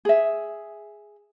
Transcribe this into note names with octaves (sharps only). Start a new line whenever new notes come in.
G#4 E5